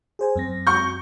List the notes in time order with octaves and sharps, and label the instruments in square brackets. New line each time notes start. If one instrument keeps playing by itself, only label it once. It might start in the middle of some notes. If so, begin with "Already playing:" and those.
[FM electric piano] G#4 C5 G#5
F#2 C4 A#6
[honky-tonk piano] C#6 G6